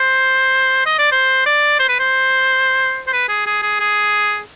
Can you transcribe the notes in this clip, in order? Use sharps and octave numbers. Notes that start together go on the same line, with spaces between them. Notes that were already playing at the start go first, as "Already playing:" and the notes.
Already playing: C5
D#5
D5
C5
D5
C5
B4
C5
C5
B4
G#4
G#4
G#4
G#4